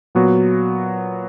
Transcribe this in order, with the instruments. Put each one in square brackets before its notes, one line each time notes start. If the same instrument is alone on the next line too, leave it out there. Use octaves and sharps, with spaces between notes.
[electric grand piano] A#2 F#3 B3 F#4